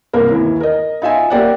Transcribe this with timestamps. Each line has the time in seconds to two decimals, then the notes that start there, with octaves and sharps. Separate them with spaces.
0.13 C2 A#3 A#4
0.31 D#2 E3
0.60 A#4 D#5
1.02 D#4 F4 E5 G#5
1.30 A#3 G4 D5 E5 F#5